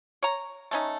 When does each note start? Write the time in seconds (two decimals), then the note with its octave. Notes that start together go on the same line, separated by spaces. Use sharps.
0.23 C#5 A#5
0.71 A3 C#4 D#4